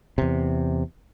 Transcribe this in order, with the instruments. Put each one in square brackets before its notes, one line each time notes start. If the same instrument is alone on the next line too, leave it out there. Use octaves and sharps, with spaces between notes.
[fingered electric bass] E2 C3